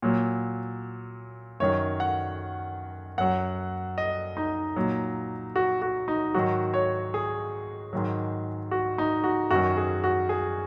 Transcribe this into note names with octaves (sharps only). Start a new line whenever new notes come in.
A#2 F#3
F#2 D#3 F#3 C#5
F#5
F#2 F#3 F#5
D#5
D#4
A#2 F#3
F#4
F#4
D#4
G#2 D#3 F#3 F#4
C#5
G#4
G#2 D#3 F#3
F#4
D#4
F#4
F#2 D#3 F#3 F#4
G#4
F#4
G#4